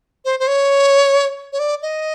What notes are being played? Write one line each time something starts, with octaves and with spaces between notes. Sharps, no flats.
C5
C5
C#5
C#5
D5
D#5